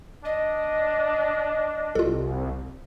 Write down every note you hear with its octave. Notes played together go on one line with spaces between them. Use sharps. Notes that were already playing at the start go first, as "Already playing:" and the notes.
D4 D#5
C2 F4 A4